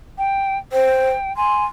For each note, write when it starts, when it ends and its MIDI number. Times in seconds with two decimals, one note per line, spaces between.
0.18 0.58 79
0.72 1.11 72
0.72 1.35 79
1.37 1.65 80
1.37 1.64 84